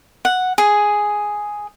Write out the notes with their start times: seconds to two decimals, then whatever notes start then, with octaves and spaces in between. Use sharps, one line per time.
0.25 F#5
0.58 G#4